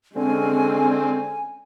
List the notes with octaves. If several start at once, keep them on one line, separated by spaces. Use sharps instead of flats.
D3 G#3 C4 C#4 G#5